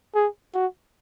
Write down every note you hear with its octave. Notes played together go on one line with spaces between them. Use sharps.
G#4
F#4